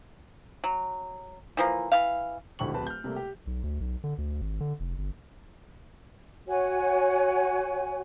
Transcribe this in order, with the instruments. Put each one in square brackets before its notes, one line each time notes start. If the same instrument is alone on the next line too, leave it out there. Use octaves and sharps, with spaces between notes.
[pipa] F#3
E3 F3 A#3
E3 F5
[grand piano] G#1 A2 D3 G4 C#6 F#7
D1 C4 B4 A5
F6 G6
C3 G3 A3 A#3
G4
[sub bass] B1
D2
B1
D3
D2
G#1
D3
F1
G1
[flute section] F#4 C#5 G#5